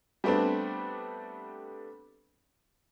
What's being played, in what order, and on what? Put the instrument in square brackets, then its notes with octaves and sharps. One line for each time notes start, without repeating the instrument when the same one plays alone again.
[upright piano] G3 A3 B3 C4 D4